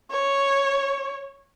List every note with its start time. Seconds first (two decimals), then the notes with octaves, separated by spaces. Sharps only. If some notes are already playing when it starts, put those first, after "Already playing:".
0.11 C#5